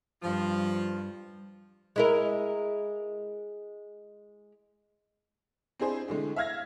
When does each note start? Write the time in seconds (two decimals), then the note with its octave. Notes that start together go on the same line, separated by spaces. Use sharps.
0.22 G2 F3
1.96 G#3 E4 A#4
5.80 C4 D4 E4 G#4 C5
6.08 A2 D3 G#3 A3
6.36 E5 F5 F6 G#6 A#6